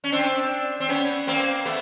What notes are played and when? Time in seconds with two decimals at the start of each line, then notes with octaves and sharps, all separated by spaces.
0.04 C#4
0.12 C4 D4
0.80 C4
0.89 B3 C#4
1.27 A#3 C4
1.66 A3 B3